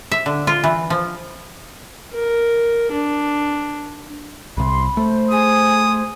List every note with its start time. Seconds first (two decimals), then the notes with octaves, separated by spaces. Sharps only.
0.12 E5
0.26 D3
0.47 F4
0.64 E3
0.90 F3
2.14 A#4
2.91 D4
4.57 C2 C3 B5 C6
4.97 A3 C5
5.31 G#4 D#6